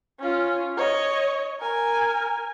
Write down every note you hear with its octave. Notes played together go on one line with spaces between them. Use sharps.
C#4 F4
C#5 D#5
A#4 G#5